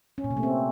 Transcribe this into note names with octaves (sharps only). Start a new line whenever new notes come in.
C#4
A#2
C3
A3
C4